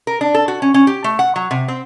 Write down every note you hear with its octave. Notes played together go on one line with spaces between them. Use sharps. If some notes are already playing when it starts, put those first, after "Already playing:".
A#4
D4
A4
F#4
C#4
C#4
G4
A3
F#5
F#3
C3
C4